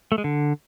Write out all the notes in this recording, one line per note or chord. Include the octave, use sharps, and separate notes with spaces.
A3
G#3
D3